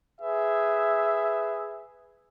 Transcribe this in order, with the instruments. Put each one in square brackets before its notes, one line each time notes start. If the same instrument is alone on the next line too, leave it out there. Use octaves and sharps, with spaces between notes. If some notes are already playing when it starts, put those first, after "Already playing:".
[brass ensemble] G#4 B4 E5